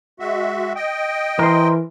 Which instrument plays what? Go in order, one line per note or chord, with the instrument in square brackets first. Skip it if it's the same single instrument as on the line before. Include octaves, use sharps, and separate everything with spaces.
[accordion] G#3 F#4 E5
D#5 G5
[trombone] E3 [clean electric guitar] A#4 C5